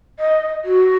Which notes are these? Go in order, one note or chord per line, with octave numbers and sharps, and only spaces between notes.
D#5
F#4